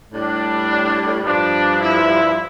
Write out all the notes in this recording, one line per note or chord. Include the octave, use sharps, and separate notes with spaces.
A2 G3 D4
G2 F3 D4
E4